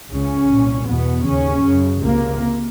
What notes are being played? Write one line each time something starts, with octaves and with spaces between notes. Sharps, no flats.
C#2 C#3 C#4
C2 A#2
E2 B2 B3
D#2 C#3 C#4
F#2 C#3
C#2 C3 A#3